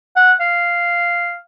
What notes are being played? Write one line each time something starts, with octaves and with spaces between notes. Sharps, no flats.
F#5
F5